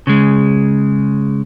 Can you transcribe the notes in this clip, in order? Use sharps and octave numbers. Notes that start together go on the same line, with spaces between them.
C#3 G#3